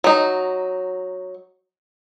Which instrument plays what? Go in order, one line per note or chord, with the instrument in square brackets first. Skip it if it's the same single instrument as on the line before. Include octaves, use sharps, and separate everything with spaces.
[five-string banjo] F#3 D#4